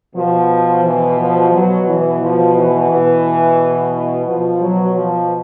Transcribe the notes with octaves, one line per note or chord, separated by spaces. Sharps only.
B2 F3
E3
F3
B2 F#3
E3
F3
E3
B2
B2 F3
F#3
F3